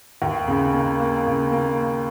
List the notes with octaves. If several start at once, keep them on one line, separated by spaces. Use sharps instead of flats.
D#2
C#3
A#3
A#3
C#3
A#3